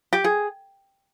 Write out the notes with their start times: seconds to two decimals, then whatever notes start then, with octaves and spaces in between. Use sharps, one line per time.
0.13 G4
0.24 G#4